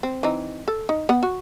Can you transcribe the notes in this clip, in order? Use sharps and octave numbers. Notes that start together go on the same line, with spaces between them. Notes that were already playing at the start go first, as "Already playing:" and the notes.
C4
E3 C4 D#4
A4
D#4
B3 F#5
F#4